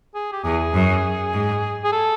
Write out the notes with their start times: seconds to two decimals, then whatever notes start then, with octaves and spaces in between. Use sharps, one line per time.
0.15 G#4
0.32 G4
0.44 E2 G#4
0.74 F#2
1.33 G#2
1.84 G#4
1.92 A4